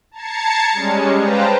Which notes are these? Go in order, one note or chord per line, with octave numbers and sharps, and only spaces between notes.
A5 A#5 G#6 A6 C7 C#7
G3 G#3 C#4
B4 C5 F5 G5 A5 A#5